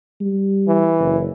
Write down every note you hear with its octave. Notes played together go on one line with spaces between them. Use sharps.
G3
E3
F#1